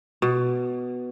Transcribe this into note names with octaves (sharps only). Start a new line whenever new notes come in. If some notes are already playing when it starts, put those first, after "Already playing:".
B2